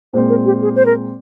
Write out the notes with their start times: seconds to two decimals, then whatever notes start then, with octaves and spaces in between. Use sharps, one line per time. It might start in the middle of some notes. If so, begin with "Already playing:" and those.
0.13 A#2 G#3 C4 C5
0.29 A#4
0.46 G4
0.61 G#4
0.76 C5
0.86 A#4